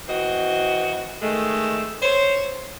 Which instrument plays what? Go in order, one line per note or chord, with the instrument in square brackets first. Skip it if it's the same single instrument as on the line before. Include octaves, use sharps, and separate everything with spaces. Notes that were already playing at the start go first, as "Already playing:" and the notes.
[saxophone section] E3 C4 F#4 D#5
D#3 G#3 A3
C5 C#5